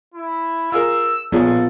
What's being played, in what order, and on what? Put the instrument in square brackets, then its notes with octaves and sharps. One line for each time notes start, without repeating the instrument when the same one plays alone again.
[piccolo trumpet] E4
[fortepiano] F4 G#4 A#4 [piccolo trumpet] E6
[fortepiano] A#1 G#4 C#5 [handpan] B3 F4 [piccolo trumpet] A4